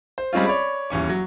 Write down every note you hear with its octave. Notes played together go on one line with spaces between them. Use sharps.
C5
G3 G#3 C4 C#4 F4
C#5 D5 B5
D#1 E2 C#4 C#6
F#3